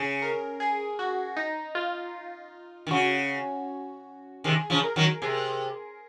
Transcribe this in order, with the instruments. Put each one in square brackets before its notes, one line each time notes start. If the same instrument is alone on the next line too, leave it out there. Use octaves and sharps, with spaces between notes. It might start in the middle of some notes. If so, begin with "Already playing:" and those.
Already playing: [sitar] C#3 [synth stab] G#4
[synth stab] A#4
G#4
F#4
D#4
F4
[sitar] D#3
[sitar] C#3 [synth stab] F#4
[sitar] C3 D#3 [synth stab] G#4
[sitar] C#3 F3
[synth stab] A#4
[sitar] D#3 F#3
[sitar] C3 [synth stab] G#4